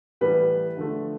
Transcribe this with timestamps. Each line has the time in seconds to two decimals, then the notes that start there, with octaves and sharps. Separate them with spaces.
0.21 A2 E3 G3 B3 B4
0.77 D3 F3 A3